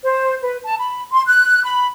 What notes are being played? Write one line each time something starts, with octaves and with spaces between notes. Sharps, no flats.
C5
B4
A5
B5
C6
F#6
B5